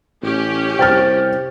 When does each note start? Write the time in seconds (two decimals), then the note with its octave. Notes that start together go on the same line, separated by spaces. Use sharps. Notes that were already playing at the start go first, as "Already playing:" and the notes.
0.23 A1 C#4 G4
0.79 C2 C5 G5 F6 A6